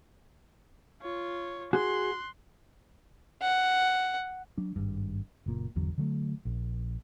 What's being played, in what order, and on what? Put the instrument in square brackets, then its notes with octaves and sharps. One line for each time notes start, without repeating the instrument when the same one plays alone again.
[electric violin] F4 C#5
[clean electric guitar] F#4 G#4 [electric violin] C6 F#6
[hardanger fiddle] F#5
[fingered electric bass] F#3 D4
G#1 G2
F#1 A#2
G#1 E2 D3 F#3
D3 F#3 A3
A#1